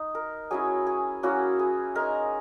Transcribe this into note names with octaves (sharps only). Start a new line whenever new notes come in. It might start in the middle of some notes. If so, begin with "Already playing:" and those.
Already playing: D#4
A#4
F#3 C#4 E4 G#4
G#4
F#3 A#3 C#4 E4 F#4
G#4
G#3 D#4 A#4